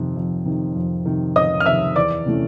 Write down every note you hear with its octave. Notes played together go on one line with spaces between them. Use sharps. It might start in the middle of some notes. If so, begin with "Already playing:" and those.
Already playing: F2 C3 D#3
F2
C3 D#3
F2
C3 D#3
F2 D#5 D#6
F6
C3 D#3 E5 E6
E2 D5 D6
C3 E3 A3 C#4